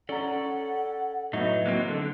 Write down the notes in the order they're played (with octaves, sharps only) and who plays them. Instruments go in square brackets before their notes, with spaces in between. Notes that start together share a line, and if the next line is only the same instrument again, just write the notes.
[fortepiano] C#4 A#5 [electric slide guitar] A4 D5 [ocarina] F#5
[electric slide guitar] A2 F#3 D#4 [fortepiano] B3 E4 [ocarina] D#5
[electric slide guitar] F#3 A#3 C4
[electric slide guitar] D3 [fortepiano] A4